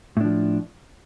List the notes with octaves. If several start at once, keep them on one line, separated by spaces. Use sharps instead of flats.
A2 F3 D4